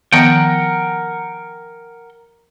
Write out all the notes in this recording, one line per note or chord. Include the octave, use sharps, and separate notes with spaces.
D#3 F3 B3 A#4 F#5 G5